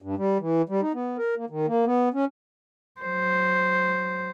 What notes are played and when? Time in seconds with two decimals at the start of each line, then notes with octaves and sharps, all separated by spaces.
0.02 G2
0.18 G3
0.40 E3
0.69 G3
0.82 D#4
0.94 B3
1.18 A#4
1.37 A#3
1.50 D#3
1.67 A#3
1.86 B3
2.14 C#4
3.01 F#3 C5